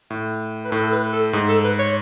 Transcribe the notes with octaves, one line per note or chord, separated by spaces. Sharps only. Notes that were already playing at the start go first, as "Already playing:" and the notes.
A2
B4
A2 A4
A4
B4
A4
G#2 G#4
A4
B4
C#5